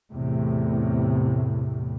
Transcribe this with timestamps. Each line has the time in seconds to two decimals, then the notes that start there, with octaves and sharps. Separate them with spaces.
0.12 E2 A2 C3